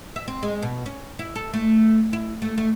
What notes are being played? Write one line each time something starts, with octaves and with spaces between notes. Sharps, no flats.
E5
C4
G#3
B2
C#4
E4
A4
A3
E4
A3
A3